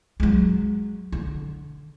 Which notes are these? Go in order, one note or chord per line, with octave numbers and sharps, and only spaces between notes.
F#3 G#3
D3